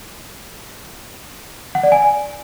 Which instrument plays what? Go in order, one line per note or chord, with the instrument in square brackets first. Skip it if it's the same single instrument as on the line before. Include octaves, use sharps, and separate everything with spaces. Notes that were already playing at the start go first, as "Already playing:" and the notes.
[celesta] F#5
D5
G#5